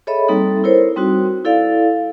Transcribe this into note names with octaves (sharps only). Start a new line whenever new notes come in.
G#4 A4 C#5 D#5 E5 B5
G3 A#3 C4 D#4 A4
E4 A#4 C5 C#5
G3 C4 D#4 F#4
E4 A4 D5 F5